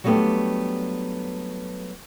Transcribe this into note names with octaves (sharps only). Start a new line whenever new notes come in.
F#3 G3 A3 B3 D4 G4